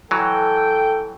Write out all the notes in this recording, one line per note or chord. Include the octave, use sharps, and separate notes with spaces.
E3 F#3 A4 G5